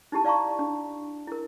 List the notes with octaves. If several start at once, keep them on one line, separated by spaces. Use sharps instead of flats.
D#4 E4 G4 A5
D5 F5 A5 A#5 C#6
D4
E4 A#4